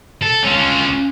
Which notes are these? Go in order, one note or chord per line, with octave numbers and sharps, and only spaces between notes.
A4
C#4 F4